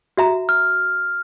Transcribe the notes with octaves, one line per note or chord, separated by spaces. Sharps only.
F#4 E5 A#5
F6